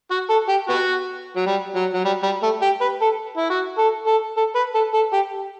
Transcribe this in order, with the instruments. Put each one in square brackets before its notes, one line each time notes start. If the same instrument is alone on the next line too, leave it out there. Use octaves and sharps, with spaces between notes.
[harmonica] F#4
A4
G4
B3 F#4
F#3
G3
F#3
F#3
G3
G3
A3
G4
B4
A4
E4
F#4
A4
A4
A4
B4
A4
A4
G4